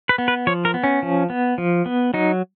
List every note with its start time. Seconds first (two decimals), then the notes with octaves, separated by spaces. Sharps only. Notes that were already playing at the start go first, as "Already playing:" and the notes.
0.09 B4
0.18 B3
0.28 B4
0.47 F3 C#5
0.65 A#4
0.74 B3
0.84 C#4
1.03 F3
1.30 B3
1.58 F3
1.86 B3
2.14 F#3 D#4